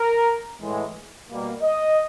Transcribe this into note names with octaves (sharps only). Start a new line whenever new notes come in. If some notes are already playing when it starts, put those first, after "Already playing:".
Already playing: A#4
A2 E3 G#3
B2 G3 A#3
D#5